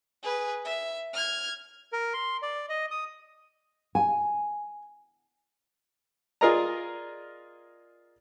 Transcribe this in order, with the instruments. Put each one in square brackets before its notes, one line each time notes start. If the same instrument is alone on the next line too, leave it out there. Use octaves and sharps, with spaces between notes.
[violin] G#4 B4
E5
F6 G#6
[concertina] A#4
C6
D5
D#5
D#6
[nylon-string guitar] G#5
[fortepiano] F4 G#4 A#4 D5 D#5 A#5